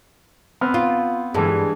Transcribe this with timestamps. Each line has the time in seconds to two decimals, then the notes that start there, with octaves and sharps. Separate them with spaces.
0.61 B3 C4 F6
0.74 F4
1.34 G2 E3 G#3 A3